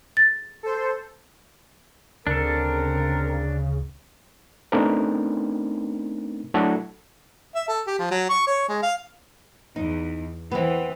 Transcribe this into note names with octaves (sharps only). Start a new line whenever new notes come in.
A6
A4 C5
D2 C#3 C4 D4 A4 A#4
A3 B3 C4 D4 D#4 A#4
F#3 A3 D4 E4 F#4 A4
E5
A4
G4
F3
F#3
C#6
C#5
G#3
F5
E2 D#4
E3 B3 C4